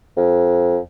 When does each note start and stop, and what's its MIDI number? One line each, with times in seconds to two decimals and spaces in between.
0.17 0.77 41